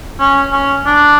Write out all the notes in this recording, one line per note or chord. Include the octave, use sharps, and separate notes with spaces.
C#4
C#4
D4